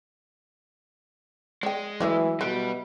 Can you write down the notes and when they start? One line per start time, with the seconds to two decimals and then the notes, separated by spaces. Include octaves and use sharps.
1.63 G#3 D5 G5
2.00 E3 F#3 A3 E4 D5 E5
2.41 B2 G3 B4